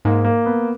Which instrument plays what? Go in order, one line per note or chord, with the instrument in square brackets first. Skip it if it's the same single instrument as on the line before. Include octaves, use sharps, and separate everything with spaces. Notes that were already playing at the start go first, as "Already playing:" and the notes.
[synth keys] G#2 [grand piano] A#3
[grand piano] A#3
B3